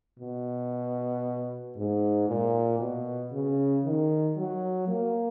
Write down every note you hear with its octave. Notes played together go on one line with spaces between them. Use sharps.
B2
G#2
A#2
B2
C#3
D#3
F#3
A#3